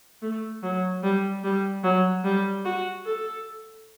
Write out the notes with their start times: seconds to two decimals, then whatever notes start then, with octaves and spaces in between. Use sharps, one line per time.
0.22 A3
0.63 F#3
1.03 G3
1.44 G3
1.84 F#3
2.24 G3
2.65 F#4
3.05 A4